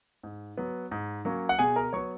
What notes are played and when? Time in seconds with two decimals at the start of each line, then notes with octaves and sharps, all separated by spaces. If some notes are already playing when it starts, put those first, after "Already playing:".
0.23 G#2
0.57 F#3 B3
0.91 G#2
1.25 F#3 A#3 C#4
1.49 F#5
1.59 B2 G#4 G#5
1.76 A#4 A#5
1.93 F#3 B3 C#5 C#6